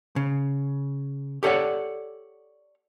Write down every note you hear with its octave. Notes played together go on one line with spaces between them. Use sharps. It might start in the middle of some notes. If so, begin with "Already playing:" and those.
C#3
G4 A4 C#5 D5 F#5